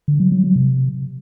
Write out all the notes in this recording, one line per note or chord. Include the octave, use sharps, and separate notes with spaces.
D3
F#3
F#3
F#3
C3